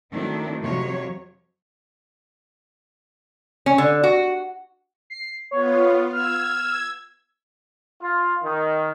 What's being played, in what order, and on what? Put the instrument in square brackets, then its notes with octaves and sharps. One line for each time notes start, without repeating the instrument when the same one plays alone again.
[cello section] D#3 F#3 A3 C4 D4 E4
F2 C3 F#3 C#5
[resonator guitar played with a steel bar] C#4
D3
F#4
[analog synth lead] C7
[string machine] B3 F4 [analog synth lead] C#5
[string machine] E6 G#6 [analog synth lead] F6
[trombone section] F4
D#3